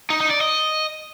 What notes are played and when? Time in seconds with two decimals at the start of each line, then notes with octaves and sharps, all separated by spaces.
0.10 D#4
0.20 D#4
0.31 D5
0.41 D#5